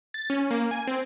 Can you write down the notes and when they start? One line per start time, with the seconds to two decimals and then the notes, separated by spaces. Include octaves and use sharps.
0.14 A6
0.30 C#4
0.51 A#3
0.71 G#5
0.87 C4